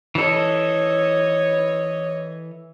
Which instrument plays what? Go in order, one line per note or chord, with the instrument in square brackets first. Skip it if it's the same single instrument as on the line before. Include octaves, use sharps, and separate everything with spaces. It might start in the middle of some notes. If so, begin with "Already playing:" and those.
[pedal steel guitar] E3 A4 [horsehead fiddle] C#5 D#5